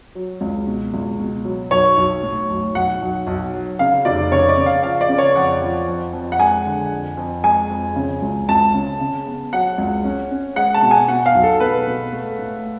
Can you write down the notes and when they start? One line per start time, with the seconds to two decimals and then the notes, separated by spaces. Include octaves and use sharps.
0.15 F#3
0.41 C#2
0.67 B2
0.94 C#2
1.19 B2
1.45 F#3
1.71 B1 C#5
1.97 B1
2.23 A2
2.50 B1
2.75 B1 F#5
3.02 B1
3.27 B1
3.54 F#3
3.79 C#3 F5
4.05 F1 D5
4.32 C#3 C#5
4.49 D5
4.57 C#3
4.66 F5
4.83 F3 F5
5.01 D5
5.09 C#3
5.18 C#5
5.36 F2 F#5
5.62 F3
5.88 F2
6.13 F2
6.32 F#5
6.39 G#3 G#5
6.66 D3
6.91 F2
7.17 F2
7.43 G#3 G#5
7.70 F2
7.96 C#3
8.22 C#2
8.49 C#2 A5
8.74 C#3
9.00 C#3
9.26 B3
9.53 F#3 F#5
9.78 C#2
10.04 C#4
10.31 C#4
10.56 G#3 F#5
10.74 A5
10.82 B2
10.91 G#5
11.08 B2 F#5
11.26 F5
11.35 B1
11.43 A4
11.60 B2 B4
11.87 B2
12.12 A3
12.39 A2